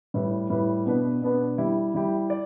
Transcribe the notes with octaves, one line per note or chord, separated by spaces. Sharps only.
A2 G3 E4 B4
A2 G3 E4 B4
B2 B3 D4 B4
B2 B3 D4 B4
G3 E4 G4
G3 E4 G4
D5